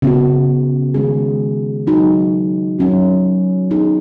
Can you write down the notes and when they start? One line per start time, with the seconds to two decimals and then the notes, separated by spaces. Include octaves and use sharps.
0.02 C#3 B3 F#4
0.94 D#3 G#3 C#4 G#4
1.87 F#3 D#4 F#4
2.79 F#3 C#4 F#4
3.70 F#3 B3 D#4 G#4